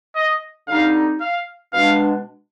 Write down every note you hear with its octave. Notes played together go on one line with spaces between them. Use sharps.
D#5
D3 G3 C4 D#4 F5
F5
B2 G#3 D4 F5